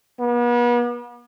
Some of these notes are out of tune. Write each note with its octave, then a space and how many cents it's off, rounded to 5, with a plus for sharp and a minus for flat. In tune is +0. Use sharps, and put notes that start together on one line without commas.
B3 -40